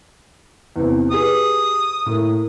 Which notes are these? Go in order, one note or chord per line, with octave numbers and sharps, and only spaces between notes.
E2 C3
G4 G#4 B4 D#6
A2 A#3